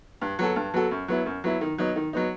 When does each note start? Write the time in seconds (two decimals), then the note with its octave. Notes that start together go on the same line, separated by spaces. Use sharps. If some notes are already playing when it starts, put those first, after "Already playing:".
0.21 G2
0.39 F#3 B3 F#4 A4
0.56 G2
0.74 F#3 B3 F#4 A4
0.91 F#2
1.08 F#3 B3 E4
1.26 F#2
1.44 F#3 B3 E4
1.61 D#3
1.78 F#3 B3 D#4
1.96 D#3
2.13 F#3 B3 D#4